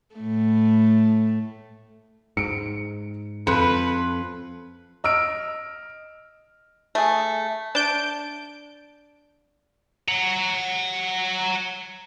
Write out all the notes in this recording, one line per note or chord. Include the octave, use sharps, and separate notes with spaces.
A2 A3
G#2 C#7 D7
F2 A4 B4 C6 C#7
D#5 E6 F6 D7
A3 G#4
D4 A5 G6 D7
F#5 A#5